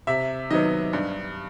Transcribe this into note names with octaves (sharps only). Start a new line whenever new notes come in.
C3 E5
D#3 F#3 B3 D#5
G2